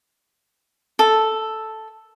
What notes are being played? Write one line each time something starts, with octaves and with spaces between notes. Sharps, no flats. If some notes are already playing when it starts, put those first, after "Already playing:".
A4